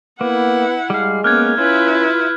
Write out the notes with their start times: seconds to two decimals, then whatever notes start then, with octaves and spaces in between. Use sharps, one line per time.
0.21 A#3 B3 E4 F#5
0.90 G3 G#3 F5
1.24 A#3 B3 C#4 F6 F#6 G#6
1.58 C#4 E4 F4 B4